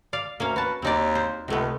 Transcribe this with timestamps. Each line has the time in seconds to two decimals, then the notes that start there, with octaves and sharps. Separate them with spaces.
0.13 D5 F5
0.40 D2 A#3 C#4 F5
0.56 F#4 B4 A5
0.82 D#2 C4 D#4 D5
1.15 C5
1.48 C#2 C3 A3 B3